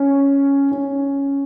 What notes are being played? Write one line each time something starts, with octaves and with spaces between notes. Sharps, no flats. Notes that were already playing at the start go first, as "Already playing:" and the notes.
Already playing: C#4
C#4